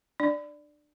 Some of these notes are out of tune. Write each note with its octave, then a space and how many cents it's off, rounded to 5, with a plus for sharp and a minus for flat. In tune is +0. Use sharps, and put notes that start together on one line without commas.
D4 +30 D5 +0